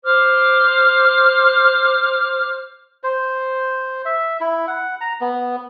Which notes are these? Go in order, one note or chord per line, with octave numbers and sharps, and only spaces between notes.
C5 D6 F6
C5
E5
E4
F#5
A#5
B3